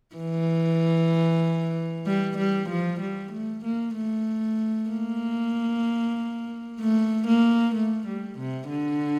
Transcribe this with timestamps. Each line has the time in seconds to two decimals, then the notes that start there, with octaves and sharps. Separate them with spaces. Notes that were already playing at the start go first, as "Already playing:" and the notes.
0.16 E3
2.06 G3
2.38 G3
2.69 F3
3.01 G3
3.32 A3
3.64 A#3
3.96 A3
4.90 A#3
6.80 A3
7.27 A#3
7.75 A3
8.07 G3
8.39 C3
8.69 D3